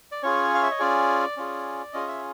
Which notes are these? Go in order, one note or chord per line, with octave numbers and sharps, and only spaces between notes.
D5
C#4 F4 G#4 C#5
F5
E5
D#5
C#4 F4 G#4 D5
C#4 F4 G#4
C#4 F4 G#4 D#5
E5